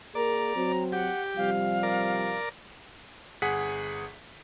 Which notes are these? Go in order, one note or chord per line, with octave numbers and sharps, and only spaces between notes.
A#3 G#4 A#4 D5 A#5
F#3 C4
G4 F#5
C3 F3 G3 F5
A#4 D5
G1 G#4 F#5 B6